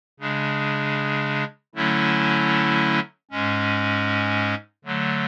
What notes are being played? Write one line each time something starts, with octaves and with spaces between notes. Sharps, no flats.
C#3 G#3 D4
D3 F#3 A3 C#4 E4
G#2 G#3 C#4
D3 F#3 A3